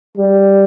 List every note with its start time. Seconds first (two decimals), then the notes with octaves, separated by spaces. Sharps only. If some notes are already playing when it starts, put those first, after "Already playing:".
0.17 G3